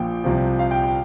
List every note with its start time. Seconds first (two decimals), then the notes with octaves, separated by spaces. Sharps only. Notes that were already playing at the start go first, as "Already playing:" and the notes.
Already playing: A#1 A#2 F3 G5
0.24 C2 C3 F3
0.59 F5
0.71 G5
0.83 G5